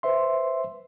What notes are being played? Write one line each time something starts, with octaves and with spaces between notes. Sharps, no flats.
B4 C5 E5 C6